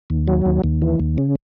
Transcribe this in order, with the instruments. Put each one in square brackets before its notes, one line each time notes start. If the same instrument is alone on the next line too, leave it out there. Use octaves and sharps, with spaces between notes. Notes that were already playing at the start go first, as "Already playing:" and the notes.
[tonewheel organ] D#2
F#3
D#2
D#2
E3
D#2
C#3